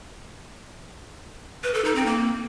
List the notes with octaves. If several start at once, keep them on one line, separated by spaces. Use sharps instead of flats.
B4
A4
D#4
C4
A#3